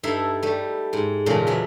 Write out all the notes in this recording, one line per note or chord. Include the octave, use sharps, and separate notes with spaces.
G2 D#4 E4 A4 E5 C6
G3 A3
G#2
E2 A#2 C#3 G#3 A3
E2 F#3 B3 E5